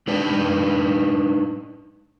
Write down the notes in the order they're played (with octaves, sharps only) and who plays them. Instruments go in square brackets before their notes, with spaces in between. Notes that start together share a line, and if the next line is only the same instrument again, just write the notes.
[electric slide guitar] G#3 D4 D#4 B4 D5 G5